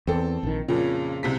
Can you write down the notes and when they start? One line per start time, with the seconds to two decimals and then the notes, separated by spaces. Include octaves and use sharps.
0.07 E2 C4 A4
0.43 A#1 D#3
0.68 F2 A#2 C#3
1.23 C2 C3 B6